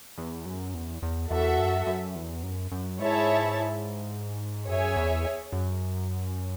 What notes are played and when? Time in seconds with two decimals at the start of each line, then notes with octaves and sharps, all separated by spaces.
0.18 E2
0.46 F#2
0.74 E2
1.03 E2
1.31 E2 F#4 A4 E5
1.58 F#2
1.87 F#2
2.15 E2
2.43 F#2
2.71 F#2
2.99 G#2 E4 G#4 C#5 E5 A5
4.68 F#2 G#4 C#5 E5 G#5
4.96 E2
5.53 F#2